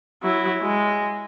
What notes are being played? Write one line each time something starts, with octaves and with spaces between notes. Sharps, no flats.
F#3 E4
G#3